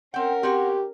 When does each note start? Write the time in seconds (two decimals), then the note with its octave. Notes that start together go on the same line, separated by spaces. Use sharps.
0.14 C4 C#4 A#4 F#5 G5
0.43 C4 F#4 G4 C#5